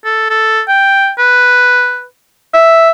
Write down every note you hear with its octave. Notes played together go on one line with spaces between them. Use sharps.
A4
A4
G5
B4
E5